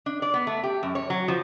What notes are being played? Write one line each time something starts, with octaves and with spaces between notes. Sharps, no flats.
D4
D5
B3
A3
G4
F#2
C#5
F#3
F3